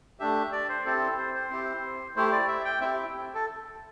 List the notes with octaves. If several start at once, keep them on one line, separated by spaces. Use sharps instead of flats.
A3 D4 G4 E5
D5
C5
C4 E4 G4 A4
C5
C5
C4 E4 G4
A3 E4 G4 C5
D5
E5
G5
C4 E4 G4 E5
A4